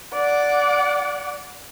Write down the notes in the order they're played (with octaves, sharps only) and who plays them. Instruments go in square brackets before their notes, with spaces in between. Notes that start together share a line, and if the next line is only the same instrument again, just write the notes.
[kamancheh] D5 F#5